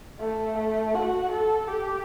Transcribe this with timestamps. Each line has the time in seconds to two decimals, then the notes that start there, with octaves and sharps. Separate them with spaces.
0.19 A3
0.57 A3
0.94 F#4
1.31 A4
1.68 G4